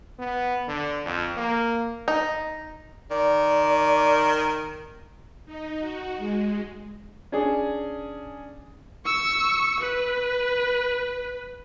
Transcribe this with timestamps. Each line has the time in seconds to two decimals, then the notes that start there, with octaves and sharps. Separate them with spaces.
0.19 B3
0.68 D3
1.06 F2
1.37 A#3
2.08 D#4
3.11 D#3 D5
5.46 D#4
5.79 F#4
6.18 G#3
7.32 C#4 D4 G#4
9.06 C#6 E6
9.81 B4